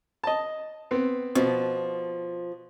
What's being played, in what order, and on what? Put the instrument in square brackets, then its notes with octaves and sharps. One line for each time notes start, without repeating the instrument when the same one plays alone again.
[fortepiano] D#5 A5
B3 C4
[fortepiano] B2 [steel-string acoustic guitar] F3